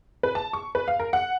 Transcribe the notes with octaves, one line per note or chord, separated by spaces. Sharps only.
B4
A5
C#6
B4
F5
A#4
F#5